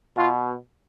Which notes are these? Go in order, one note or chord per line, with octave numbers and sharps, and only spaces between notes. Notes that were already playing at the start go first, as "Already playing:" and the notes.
B2 F4